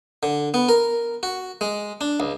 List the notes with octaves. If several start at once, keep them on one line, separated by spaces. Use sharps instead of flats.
D3
B3
A#4
F#4
G#3
D4
C#2